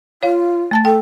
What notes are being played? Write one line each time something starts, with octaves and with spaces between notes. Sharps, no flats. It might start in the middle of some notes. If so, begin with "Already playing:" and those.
F4 C#5 F5
A3 A5 A6
A4 G5